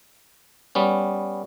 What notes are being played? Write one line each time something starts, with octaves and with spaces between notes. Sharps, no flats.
G3 B3 C#4